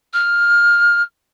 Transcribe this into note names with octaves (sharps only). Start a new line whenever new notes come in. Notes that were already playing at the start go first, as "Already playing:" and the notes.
F6